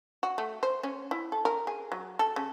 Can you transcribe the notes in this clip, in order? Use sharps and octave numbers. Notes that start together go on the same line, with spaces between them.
F#4
A3
C5
C#4
E4
A4
A#4
G#4
F#3
A4
C#3